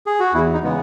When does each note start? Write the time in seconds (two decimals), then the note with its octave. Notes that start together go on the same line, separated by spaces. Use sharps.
0.06 G#4
0.20 F#4
0.33 E2 E4
0.54 D#4
0.63 C#3 E3 G#3 B3